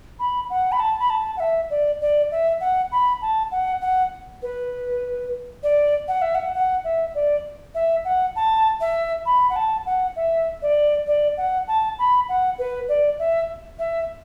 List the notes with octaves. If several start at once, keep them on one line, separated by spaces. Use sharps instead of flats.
B5
F#5
B5
A5
B5
A5
F#5
E5
D5
D5
E5
F#5
B5
A5
F#5
F#5
B4
D5
F#5
E5
F#5
F#5
E5
D5
E5
F#5
A5
E5
B5
F#5
A5
F#5
E5
D5
D5
F#5
A5
B5
F#5
B4
D5
E5
E5